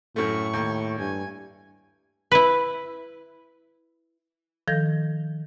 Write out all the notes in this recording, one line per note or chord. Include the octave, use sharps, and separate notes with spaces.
F#2 A2 A3 C#6
D#2
G2 G#5
E4 B4
D#3 F3 A4 G6 A#6